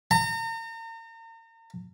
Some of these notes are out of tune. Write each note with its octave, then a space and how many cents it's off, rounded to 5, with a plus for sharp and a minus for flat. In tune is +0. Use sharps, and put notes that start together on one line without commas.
A#5 -40